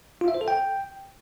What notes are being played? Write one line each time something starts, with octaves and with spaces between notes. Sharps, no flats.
F4
E5
C5
A4
G5